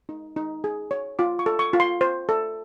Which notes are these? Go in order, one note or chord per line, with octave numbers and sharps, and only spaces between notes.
D#4
D#4
G#4
C#5
F4 D6
C#6
A4
C#6
F4
C6
C5
A4